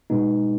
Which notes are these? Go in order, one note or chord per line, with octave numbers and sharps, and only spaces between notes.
B2 G#3 B3 D#4